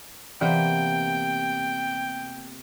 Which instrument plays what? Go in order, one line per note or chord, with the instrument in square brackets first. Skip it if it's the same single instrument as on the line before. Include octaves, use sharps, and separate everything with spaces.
[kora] C3 A#3 B3 [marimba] E3 [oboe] G5